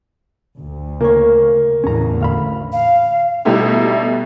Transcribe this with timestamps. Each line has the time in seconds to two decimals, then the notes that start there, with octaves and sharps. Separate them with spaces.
0.58 D2
1.01 C#3 A#3 C#5
1.84 E2 A2 D3 C#4 A#5
2.21 A1 D2 F5 B5
2.72 F5
3.45 B2 G3 A3 D#4 E4 G4